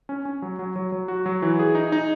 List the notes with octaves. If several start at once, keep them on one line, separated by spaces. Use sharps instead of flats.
C#4
C#4
F#3
F#3
F#3
F#3
F#4
F#3
E3
G#4
D#4
D#4